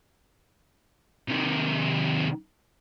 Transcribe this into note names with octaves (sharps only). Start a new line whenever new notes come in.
C3 D#3